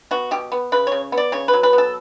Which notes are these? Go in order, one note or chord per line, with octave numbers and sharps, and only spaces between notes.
B3 F#4
B2 G4
B3
C#3 B4
C#3 C#5
B3
D5
C#3 C#5
B4
F#3
B4
B3
A4